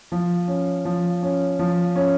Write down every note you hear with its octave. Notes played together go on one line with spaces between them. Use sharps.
F3
C#4
F3
C#4
F3
C#4